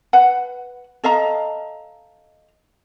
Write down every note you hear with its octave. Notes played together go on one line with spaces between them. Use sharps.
B4 F#5
A4 D#5 F5 A#5